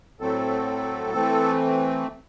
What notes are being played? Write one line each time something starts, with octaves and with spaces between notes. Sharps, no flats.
A2 F#3 A3 C4 A4
E3 A3 C4